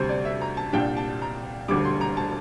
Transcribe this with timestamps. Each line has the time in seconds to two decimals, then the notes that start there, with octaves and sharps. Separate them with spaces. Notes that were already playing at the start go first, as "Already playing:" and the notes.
Already playing: D2 C3 G3 C5
0.09 D5
0.25 E5
0.41 A#5
0.57 A5
0.73 C2 A#2 G3 D4 G5
0.97 A5
1.22 A#5
1.68 E1 D2 D3 G3 D6
1.85 C6
2.01 A#5
2.17 A5